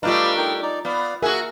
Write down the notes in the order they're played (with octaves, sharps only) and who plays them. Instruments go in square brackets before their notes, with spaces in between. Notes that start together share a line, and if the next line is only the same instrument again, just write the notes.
[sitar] G3 A3 D4 [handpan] F4 D#5 [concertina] B4 F5 A#5
[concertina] D#4 A#4 G5
D#4 D5 D6
[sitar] B3 [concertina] D5 F5
[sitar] F#4 G#4 [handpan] A#4 [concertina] E5 F#5